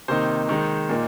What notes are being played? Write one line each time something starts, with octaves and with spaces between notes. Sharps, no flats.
C3 D#3 A#3 D#4 C5
D#3 G#3 D#4
A#2 A#3 D#4